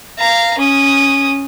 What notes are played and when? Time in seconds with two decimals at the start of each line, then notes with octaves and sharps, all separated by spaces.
0.19 F5 A#5
0.58 C#4 D#6